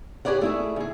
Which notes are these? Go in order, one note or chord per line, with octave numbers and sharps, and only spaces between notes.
G4 G#4 B4 C#5 D5 F#5
A3 E4 G#4
D2 G#4